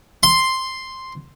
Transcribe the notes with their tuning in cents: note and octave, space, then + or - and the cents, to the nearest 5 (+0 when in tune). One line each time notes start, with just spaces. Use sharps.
C6 +0